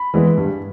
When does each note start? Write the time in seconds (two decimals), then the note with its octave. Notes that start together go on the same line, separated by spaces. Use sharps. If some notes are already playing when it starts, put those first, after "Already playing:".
Already playing: B5
0.14 E3 G#3 B3
0.38 G2